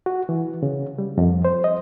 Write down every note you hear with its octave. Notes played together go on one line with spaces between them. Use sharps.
F#4
E3
C#3
G3
F2
C5
D#5